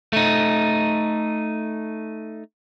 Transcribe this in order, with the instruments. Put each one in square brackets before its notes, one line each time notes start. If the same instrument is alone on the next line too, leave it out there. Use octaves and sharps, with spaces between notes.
[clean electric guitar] A3 D#4